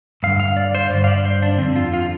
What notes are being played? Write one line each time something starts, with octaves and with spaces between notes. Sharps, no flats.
G2 D3 F5
F5
D5
C5
G2 D3 D5
F5
D5
C5
D4
F2 D3 C4
F4
F4